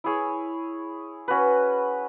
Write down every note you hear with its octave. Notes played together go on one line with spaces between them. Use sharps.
E4 G#4 C#5
C#4 F#4 B4